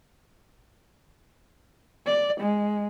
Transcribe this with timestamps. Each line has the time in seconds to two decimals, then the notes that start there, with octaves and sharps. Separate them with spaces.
2.06 D5
2.40 G#3